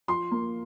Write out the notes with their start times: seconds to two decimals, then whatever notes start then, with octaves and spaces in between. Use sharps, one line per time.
0.08 F3 C6
0.31 A#3